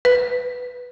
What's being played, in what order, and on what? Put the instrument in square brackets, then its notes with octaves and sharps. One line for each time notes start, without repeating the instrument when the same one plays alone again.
[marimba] B4